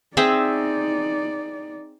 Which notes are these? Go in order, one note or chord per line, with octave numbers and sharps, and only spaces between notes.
C4 D#4 G#4 D5 E5